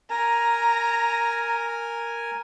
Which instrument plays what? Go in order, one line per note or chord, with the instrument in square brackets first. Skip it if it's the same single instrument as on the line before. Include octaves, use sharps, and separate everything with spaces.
[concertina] A#4 G#5 [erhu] A#5